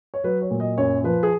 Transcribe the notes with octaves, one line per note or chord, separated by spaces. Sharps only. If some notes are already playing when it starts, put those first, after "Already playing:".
C#5
F#3 B4
C#5
A#2
D#5
F#2 C#5
F3 B4
G#4